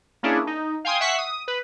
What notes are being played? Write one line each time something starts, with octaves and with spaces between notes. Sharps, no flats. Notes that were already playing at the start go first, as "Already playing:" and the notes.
A#3 C#4 D4 E4 G#4
D#4
F5 G5 G#5 C6 D#6
E5 F#5 C#6 B6 C7
D#6
B4